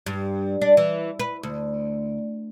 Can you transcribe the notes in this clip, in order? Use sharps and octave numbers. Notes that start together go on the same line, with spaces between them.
G2
D4
E3
B4
D2